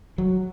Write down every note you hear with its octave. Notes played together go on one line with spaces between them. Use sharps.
F#3